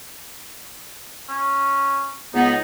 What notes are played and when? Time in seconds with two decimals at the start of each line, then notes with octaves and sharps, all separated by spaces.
1.29 C#4
2.34 C#2 B3 D#4